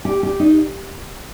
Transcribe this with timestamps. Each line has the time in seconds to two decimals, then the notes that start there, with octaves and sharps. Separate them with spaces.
0.05 G4
0.23 G4
0.40 D#4